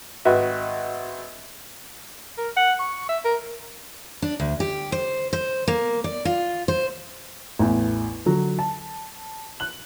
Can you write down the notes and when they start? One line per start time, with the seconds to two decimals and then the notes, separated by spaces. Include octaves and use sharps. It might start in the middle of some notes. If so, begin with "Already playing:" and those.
0.25 G#1 F#4 B4 E5
2.38 A#4
2.57 F#5
2.79 C#6
3.09 E5
3.25 A#4
4.22 D4
4.40 D2
4.60 G4
4.92 C5
5.33 C5
5.68 A#3
6.04 D5
6.25 F4
6.68 C5
7.59 A1 E2
8.26 D3 F#3
8.59 A5
9.60 F#6 F#7